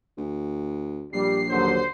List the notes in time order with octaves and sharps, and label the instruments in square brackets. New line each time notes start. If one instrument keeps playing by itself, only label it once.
[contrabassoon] D2
[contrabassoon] A#1 [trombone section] G3 [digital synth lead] C7
[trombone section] D#2 D3 F#3 [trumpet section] C5